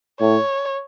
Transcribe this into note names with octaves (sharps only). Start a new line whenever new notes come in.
A2 C#5